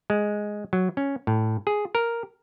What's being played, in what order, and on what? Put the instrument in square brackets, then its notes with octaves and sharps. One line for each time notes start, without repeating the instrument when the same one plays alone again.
[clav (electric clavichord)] G#3
F#3
C#4
A2
G#4
A#4